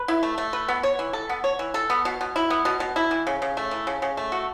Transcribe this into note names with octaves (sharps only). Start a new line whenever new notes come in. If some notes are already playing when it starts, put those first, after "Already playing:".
Already playing: B4
E4
A3
A3
B4
B3
C#5
E3
A4
B3
C#5
E3
A4
B3
B2
B2
E4
B3
B2
B2
E4
E3
C#3
C#3
A3
E3
C#3
C#3
A3
F#4